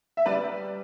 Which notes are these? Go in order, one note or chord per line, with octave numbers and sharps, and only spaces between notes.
E5
G3 B4 D5